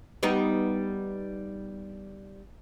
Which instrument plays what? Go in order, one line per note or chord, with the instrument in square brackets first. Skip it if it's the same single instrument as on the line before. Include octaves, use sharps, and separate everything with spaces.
[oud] G3 B3 D#4